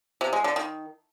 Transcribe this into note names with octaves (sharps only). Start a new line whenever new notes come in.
C3
G#3
D3
D#3